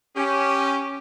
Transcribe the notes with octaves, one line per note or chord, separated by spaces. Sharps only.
C#4 G4